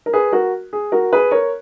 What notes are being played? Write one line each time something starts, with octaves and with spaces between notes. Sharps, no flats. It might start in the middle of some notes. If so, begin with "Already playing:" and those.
A#4
G#4 B4
F#4 A#4
G#4
F#4 A#4
G#4 B4
A#4 C#5